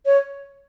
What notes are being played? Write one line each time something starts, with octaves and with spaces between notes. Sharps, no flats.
C#5